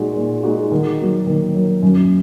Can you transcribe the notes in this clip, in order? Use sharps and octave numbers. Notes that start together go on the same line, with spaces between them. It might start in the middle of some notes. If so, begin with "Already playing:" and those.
Already playing: A#2 G#3 D#4 F#4
A#2
G#3 D#4 F#4
D#3
F#3 A#3
D#3
F#3 A#3
F#2